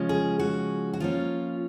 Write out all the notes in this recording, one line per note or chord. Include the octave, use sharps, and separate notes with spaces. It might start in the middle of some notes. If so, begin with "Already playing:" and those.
Already playing: C#3 F3 G#3 C#4
G#4
F#4
F#4
F3 A#3 C#4 F4